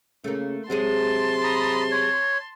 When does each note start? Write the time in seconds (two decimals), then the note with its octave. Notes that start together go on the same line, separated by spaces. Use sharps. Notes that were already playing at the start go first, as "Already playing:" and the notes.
0.24 C#3 A3 A#3
0.70 C3 F#3 G#3 G#4 A5 C6
1.44 A#5 B5 D#6
1.91 C#5